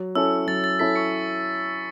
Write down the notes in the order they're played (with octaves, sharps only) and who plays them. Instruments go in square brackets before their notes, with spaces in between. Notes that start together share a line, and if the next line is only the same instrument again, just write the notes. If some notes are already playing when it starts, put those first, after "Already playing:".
Already playing: [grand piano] F#3
[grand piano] C#4 E4 A4 [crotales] E6
[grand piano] F#3 [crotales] A6
[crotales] A6
[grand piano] C#4 E4 A4 [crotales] B6
[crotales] C#6 C#7